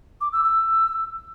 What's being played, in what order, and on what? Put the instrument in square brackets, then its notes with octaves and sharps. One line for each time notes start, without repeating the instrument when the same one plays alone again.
[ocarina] D6
E6
E6